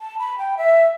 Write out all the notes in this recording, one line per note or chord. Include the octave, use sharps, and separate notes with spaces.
A5
B5
G5
E5